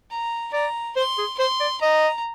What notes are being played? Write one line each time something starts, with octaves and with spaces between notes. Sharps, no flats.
A#5
D5 A#5
C5 C6
G#4
C5 C6
D5
D#5 A#5